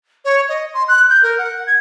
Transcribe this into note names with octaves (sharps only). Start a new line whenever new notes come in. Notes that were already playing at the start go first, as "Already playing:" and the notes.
C#5
D#5
C6
F#6
G6
A#4
F#5
G#6